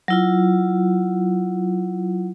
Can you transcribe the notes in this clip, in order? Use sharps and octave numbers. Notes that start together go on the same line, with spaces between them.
F#3 E4 F4